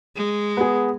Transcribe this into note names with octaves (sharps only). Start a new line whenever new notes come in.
G#3
B3 G#4